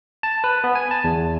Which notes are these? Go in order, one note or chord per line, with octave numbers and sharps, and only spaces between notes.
A5
B4
B3
G#5
A5
E2